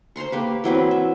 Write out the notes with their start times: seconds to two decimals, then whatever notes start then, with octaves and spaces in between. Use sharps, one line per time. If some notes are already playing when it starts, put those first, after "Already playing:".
0.16 C5 A#5 C6 C#6
0.32 A#3 G4 B4
0.64 E3 F#3 C4 B4
0.91 E5